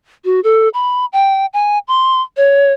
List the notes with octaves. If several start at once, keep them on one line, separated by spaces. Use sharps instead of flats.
F#4
A4
B5
G5
G#5
C6
C#5